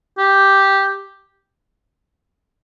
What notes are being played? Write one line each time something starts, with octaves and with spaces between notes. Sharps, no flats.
G4